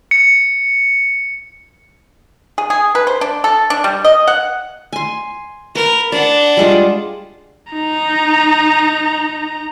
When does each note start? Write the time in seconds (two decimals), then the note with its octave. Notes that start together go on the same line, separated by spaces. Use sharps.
0.11 C#7
2.58 G#4
2.70 G#4
2.95 B4
3.07 C5
3.21 D4
3.44 A4
3.70 D4
3.84 G3
4.04 D#5
4.27 F#5
4.93 G#5 C6
5.75 A#4 B4
6.12 D4 D5 F#5
6.57 G3 G#3 F4
7.73 D#4 A#5